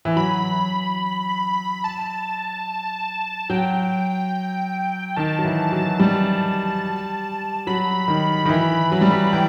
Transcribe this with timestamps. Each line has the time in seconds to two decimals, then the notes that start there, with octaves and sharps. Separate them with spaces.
0.05 E3
0.16 F#3 B5
1.84 A5
3.50 F#3 G5
5.16 D#3 A5
5.39 F#3
5.44 E3
5.72 F#3
6.00 G3
7.67 F#3 B5
8.08 D#3
8.46 D#3
8.49 E3
8.92 F#3
9.01 G3
9.11 F#3
9.33 E3 G5